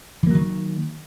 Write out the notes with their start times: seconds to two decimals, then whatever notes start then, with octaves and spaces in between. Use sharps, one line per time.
0.23 E3
0.27 A#3
0.31 F#3
0.35 D#3